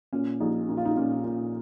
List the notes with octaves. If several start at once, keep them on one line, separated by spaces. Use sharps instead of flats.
A#2 C#4
A#1 D#4
A#2 D#4
F4
D#4
A#2 C#4
A#2